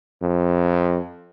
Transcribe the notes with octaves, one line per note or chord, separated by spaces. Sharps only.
F2